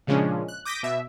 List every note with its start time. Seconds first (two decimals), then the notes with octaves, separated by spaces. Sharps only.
0.07 A#2 C#3 F3 G#3 C#4 D4
0.48 F#6
0.65 D6 D#6 G6 A#6 B6 D7
0.83 B2 E5